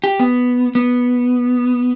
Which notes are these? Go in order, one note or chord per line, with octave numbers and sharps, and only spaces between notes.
G4
B3
B3